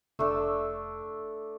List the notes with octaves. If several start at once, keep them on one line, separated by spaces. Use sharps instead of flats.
F1 A3 D4 E6